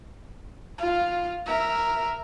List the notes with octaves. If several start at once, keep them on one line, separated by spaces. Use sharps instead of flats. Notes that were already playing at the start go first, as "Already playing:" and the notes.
F4 F5
A#4 E5